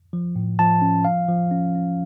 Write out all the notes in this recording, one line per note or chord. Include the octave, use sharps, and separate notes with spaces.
F3
A2
F3 A5
C#4
F3 F5
F3
C#4
C#4